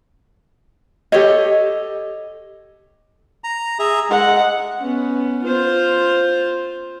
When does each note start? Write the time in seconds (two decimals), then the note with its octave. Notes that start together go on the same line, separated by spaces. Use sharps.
1.12 G4 A4 C#5 D#5
3.44 A#5
3.79 G#4 E5 A#5
4.10 G#3 F#5
4.80 B3 C#4
5.44 F4 C5